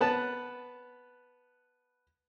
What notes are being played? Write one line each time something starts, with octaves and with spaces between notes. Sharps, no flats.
B3 B4 A5